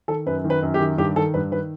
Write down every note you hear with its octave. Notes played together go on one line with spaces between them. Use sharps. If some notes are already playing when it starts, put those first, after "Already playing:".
D#3 A4
F#2 B4
D#3
B4
F#2
G4
D#3
G2 G4
D#3 A4
G2 B4
D#3 B4